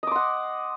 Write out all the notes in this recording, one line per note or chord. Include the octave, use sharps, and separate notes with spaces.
D#5 F#5 C6 D6